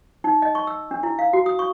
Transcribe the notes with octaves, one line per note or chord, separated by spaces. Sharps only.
D#4
D#5
C#6
E6
D4
E4
F5
F#4
D#6
C#6